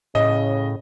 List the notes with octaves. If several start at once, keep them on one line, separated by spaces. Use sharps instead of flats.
A2 C#3 D#5